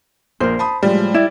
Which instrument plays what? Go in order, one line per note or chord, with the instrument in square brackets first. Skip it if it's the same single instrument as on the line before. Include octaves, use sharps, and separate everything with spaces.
[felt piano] A#1 A#4 [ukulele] C5
[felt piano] A5 B5 D#6
[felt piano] A2 F3 G#3 [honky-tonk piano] G3
[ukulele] E4 [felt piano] D5